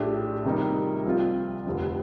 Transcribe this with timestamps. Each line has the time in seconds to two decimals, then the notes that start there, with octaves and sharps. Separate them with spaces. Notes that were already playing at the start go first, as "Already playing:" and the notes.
Already playing: A#1 A2 A3 D4 G4
0.44 C3 D#3 G3 A#3 D#4
1.05 C2 C3 F3 C4 F4
1.66 F1 D#2 D3 F3